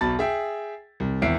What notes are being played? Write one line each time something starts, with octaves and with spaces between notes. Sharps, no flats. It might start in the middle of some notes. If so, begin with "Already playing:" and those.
B1 B2 A5 B5 A6
G#4 E5 G5
C2
G#1 E2 E5 C7 D7